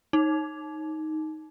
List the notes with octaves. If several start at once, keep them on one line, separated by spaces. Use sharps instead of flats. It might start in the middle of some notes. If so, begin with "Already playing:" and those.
D#4